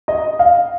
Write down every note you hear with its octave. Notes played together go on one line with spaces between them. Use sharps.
D#5
F5